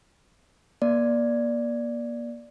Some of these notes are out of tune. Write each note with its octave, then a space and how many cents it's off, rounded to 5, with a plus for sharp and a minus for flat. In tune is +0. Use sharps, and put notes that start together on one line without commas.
A#3 +35 D5 +0